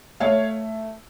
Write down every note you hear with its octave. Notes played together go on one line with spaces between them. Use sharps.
A3 C#5 F5